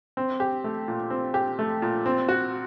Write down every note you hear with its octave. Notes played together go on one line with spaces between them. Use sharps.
C4
G4
A3
A#2
C4
G4
A3
A#2
C4
F#4